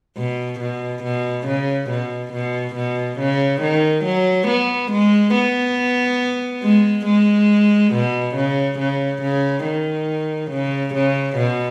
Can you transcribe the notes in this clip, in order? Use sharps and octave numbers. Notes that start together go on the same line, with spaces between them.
B2
B2
B2
C#3
B2
B2
B2
C#3
D#3
F#3
B3
G#3
B3
G#3
G#3
B2
C#3
C#3
C#3
D#3
C#3
C#3
B2